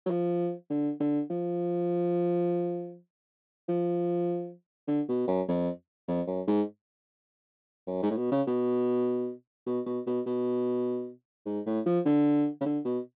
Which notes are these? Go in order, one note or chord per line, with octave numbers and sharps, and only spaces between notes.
F#3
F3
D3
D3
F3
F3
D3
B2
F#2
F2
F2
F#2
G#2
F#2
G#2
A2
B2
C#3
B2
B2
B2
B2
B2
G#2
A2
F3
D3
C#3
D3
B2